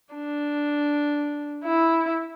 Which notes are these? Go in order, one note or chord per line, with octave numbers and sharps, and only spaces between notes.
D4
E4